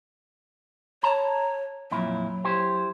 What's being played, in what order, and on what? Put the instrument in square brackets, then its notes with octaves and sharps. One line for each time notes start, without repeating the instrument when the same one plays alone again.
[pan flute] C#5 [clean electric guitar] A5 A#5
[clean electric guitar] F2 A#2 E4 [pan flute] F#3
[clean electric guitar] E4 G4 C5